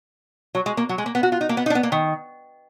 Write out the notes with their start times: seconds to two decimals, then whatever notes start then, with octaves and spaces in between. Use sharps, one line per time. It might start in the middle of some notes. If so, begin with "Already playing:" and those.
0.55 F#3
0.66 G#3
0.77 A#3
0.89 F#3
0.98 G#3
1.06 A#3
1.15 B3
1.23 F#4
1.32 F4
1.41 D#4
1.49 A#3
1.57 B3
1.66 D#4
1.70 D4
1.75 B3
1.83 A#3
1.92 D#3